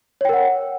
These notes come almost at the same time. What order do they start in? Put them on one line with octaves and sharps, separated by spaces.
C#5 G5 A#4 F#5